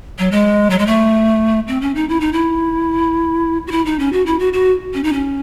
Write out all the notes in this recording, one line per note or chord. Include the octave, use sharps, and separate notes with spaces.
F#3
G#3
F#3
G#3
A3
C4
C#4
D#4
E4
D#4
E4
F#4
E4
D#4
C#4
F#4
E4
F#4
F#4
C#4
D#4
C#4